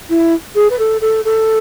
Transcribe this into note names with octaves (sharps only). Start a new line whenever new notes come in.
E4
G#4
B4
A4
A4
A4